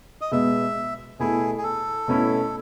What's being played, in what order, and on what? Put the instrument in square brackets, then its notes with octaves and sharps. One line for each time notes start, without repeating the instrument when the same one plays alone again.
[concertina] D#5
[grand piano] B2 G#3 B3 [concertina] E5
[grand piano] B2 A3 E4 [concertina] G#4
[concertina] G#4
A4
[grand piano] B2 A3 C#4 E4